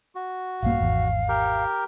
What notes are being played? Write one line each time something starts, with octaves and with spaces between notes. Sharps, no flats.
F#4
A#1 G2 A#3 F5
G#1 E2
G4 A#4